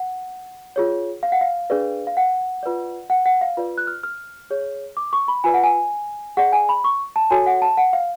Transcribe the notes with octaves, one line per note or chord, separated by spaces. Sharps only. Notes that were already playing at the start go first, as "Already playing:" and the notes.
Already playing: F#5
F4 G#4 C#5
F5
F#5
F5
D4 G#4 B4 D5
F5
F#5
F4 B4 D5
F#5
F#5
F5
F4 B4 D5
F#6
F6
F6
G#4 C#5
D6
C#6
B5
F4 B4 D5 G#5
F#5
G#5
G#4 D5 F#5
G#5
B5
C#6
A5
F#4 A4 C#5 G#5
F#5
A5
F#5
F5